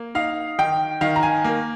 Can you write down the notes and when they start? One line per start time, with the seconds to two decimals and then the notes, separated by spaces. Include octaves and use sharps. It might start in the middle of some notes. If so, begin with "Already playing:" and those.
Already playing: A#3
0.15 D#4 F5
0.59 D#3 G5
1.01 D#3 F5
1.16 A#5
1.23 G#5
1.44 A#3